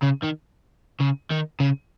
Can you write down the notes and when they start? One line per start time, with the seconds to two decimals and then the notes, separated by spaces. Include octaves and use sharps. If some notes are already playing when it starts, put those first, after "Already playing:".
0.02 C#3
0.23 D#3
1.01 C#3
1.31 D#3
1.60 C#3